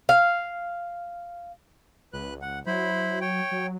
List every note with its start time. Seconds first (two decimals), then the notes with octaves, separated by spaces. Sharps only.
0.09 F5
2.13 C#2 B4 F#6
2.42 F#5
2.67 F#3 E4 C5 B5
3.21 C#5 G5
3.51 F#3